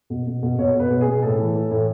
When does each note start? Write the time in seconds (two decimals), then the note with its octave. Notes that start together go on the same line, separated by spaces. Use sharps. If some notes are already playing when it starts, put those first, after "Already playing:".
0.10 B2
0.26 B2
0.43 B2
0.58 B2 C#5
0.74 B2
0.80 B4
0.90 B2
1.01 G#4
1.07 B2
1.22 A2 A4
1.38 E3
1.55 E3
1.71 A2